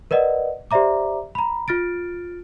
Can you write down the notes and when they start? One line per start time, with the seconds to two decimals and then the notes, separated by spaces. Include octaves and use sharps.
0.11 A#4 B4 D5 D#5 F#5
0.71 G4 C5 D5 E5 A#5 D6
1.35 A#5 B5
1.68 F4 F6 A6 D7